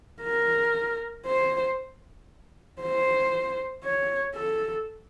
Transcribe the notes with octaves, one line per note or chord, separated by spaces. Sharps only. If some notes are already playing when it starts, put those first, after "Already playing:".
A#4
C5
C5
C#5
A4